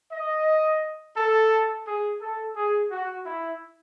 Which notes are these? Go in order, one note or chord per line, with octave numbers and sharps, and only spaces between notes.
D#5
A4
G#4
A4
G#4
F#4
E4